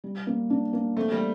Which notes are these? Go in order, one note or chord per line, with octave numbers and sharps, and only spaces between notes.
G3
A#3
D4
A#3
A3 C4
G3